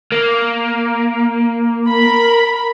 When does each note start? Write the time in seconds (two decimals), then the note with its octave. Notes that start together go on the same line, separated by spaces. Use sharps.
0.12 A#3
1.87 A#4 B5